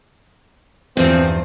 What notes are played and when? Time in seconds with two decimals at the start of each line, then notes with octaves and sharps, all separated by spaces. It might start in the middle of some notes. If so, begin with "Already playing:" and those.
0.97 E2 G2 F3 C4